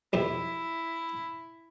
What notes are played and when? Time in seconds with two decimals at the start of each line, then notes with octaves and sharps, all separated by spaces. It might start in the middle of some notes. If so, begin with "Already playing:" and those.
0.13 B1 F2 C3 E4